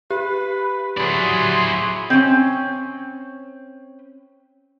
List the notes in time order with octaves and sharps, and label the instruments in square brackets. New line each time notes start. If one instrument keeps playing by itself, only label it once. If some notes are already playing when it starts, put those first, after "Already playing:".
[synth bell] G4 [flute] B4
[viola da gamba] F#3 F#4 G#4 [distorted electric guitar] E4 D5 [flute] C6
[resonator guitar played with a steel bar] C4 C#4